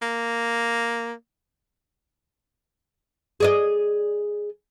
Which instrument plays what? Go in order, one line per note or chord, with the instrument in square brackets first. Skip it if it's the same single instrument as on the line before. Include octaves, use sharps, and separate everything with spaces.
[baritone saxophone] A#3
[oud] G#4 D5 D#5